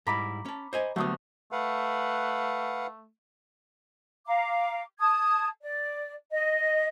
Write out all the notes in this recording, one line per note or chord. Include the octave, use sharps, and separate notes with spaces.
G#2 G3 E4 A#5 B5 D6
C#4 A5
C5 D#5 G#5
D2 F#3 G3 B3 D#6
A3 B4 F5 F#5
F5 A#5 D6
A5 D#6 G#6
D5
D#5